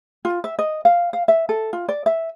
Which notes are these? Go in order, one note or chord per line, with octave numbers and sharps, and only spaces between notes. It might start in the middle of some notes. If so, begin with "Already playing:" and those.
F4
E5
D#5
F5
F5
E5
A4
F4
D5
E5